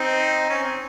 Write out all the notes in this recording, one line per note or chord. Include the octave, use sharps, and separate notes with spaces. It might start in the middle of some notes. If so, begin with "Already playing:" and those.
Already playing: C4 D#4
C#4
C4